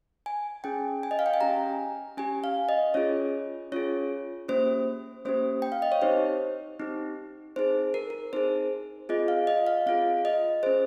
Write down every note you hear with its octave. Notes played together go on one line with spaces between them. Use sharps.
G#5
C#4 G#4 G5
G#5
D#5
F5
G5
G#5
C#4 G4 A#5
C#4 G4 G#5
F5
D#5
C#4 F4 G#4 C#5
C#4 F4 G#4 C#5
A#3 C#4 G4 C5
A#3 C#4 G4 C5
G5
F5
D#5
C#5
C4 D#4 G4 C5
C4 D#4 G4
C4 D#4 G#4 C5
A#4
A#4
C4 D#4 G#4 C5
C4 F4 G#4 D#5
F5
D#5
F5
C4 F4 G#4 F5
D#5
C#4 G#4 C5